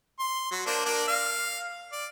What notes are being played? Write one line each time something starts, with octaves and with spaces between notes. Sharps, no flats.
C6
F#3
A#3 D4 C5
A#3 D4 D5
F5
D5